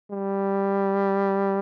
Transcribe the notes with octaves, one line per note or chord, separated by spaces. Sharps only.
G3